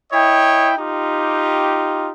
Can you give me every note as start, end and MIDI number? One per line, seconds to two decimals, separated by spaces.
0.12 0.72 64
0.12 0.72 73
0.12 0.72 75
0.12 0.72 79
0.78 2.11 63
0.78 2.11 65
0.78 2.11 67